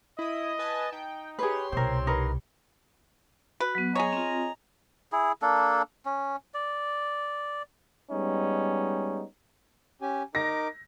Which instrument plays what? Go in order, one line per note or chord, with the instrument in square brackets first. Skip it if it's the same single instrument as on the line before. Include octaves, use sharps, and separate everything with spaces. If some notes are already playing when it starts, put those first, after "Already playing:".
[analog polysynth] E4 D#6 [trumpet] D#5
[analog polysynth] B4 G#5 A5
[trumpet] D#4 [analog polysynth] G5
[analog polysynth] G4 C#5 C6 [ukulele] G#4 B4
[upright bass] C2 B2 [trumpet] C4 [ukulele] A#4 C5
[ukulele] D#4 A#4 B4
[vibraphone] F#4 [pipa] B4
[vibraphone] F#3 B3
[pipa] G#4 C#5 [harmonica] D#5 G#5 A#5
[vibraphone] C4 F4
[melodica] E4 G#4
A#3 D4 A4
C#4
D5
[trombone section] G3 G#3 B3 C#4 D#4
[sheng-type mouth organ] C#4 G4 G#5
[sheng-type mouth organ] D#4 A#4 D6 [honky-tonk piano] A#6